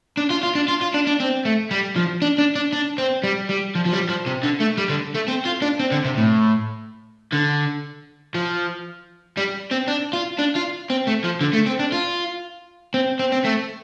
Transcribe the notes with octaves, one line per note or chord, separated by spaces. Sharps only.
D4
F4
F4
D4
F4
F4
D4
D4
C4
A3
G3
F3
D4
D4
D4
D4
C4
G3
G3
F3
F3
G3
F3
C3
D3
A3
G3
D3
A3
C4
F4
D4
C4
D3
C3
A2
D3
F3
G3
C4
D4
F4
D4
F4
C4
A3
F3
D3
A3
C4
D4
F4
C4
C4
C4
A3